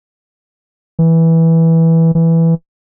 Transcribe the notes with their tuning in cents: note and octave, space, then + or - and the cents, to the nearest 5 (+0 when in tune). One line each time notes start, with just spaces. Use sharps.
E3 -10
E3 +0